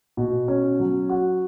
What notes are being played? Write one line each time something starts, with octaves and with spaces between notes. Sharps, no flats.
B2
C#4
F#3
F#4